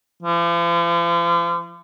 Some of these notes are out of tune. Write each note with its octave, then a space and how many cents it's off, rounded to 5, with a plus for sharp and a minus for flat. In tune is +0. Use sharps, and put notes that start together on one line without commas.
F3 -40